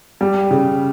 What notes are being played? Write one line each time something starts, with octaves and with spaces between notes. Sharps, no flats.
G3
C#3